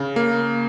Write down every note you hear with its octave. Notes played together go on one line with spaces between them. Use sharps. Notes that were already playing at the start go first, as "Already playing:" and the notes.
Already playing: C#3
A#3